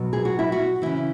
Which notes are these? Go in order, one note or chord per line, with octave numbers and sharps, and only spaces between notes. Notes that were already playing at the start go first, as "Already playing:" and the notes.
Already playing: B2 F#3
G#4
F#4
E4
F#4
C#3 E3 E4